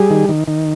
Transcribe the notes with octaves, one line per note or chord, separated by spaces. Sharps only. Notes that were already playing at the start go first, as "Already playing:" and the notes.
Already playing: G3 G#4
D#3
D#3
D#3